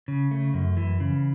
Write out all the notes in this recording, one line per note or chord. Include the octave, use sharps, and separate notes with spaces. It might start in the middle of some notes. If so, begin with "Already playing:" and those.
C#3
A3
F#2
E3
C#3